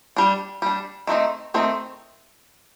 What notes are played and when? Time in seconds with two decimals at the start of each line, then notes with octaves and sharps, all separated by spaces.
0.17 G3 D4
0.62 G3 D4
1.07 D#3 A3 C4 D#4
1.54 D#3 A3 C4 D#4